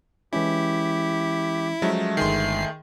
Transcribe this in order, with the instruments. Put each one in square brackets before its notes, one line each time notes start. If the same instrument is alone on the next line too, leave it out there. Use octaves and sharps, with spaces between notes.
[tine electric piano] E3 G#3 C#4 [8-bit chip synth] E4 [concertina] G4
[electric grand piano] F3 F#3 C#4 [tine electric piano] G#3 [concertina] A3
[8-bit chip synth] G1 C7 [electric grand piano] D#3 G#4 C6